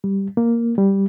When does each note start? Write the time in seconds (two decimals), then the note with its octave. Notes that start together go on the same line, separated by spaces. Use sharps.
0.04 G3
0.37 A#3
0.78 G3